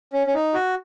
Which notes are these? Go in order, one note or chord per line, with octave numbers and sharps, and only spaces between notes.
C#4
C#4
D#4
F#4